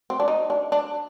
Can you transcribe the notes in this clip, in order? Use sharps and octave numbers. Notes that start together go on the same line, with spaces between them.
C4
D4
D#4
D4
D4